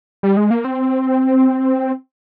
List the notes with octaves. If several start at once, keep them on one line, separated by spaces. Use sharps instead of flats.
G3
G#3
A#3
C4